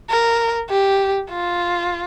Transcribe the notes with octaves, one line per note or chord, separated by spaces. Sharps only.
A#4
G4
F4